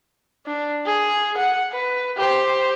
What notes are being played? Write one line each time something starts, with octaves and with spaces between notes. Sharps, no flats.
D4
G#4
F#5
B4
G4 C5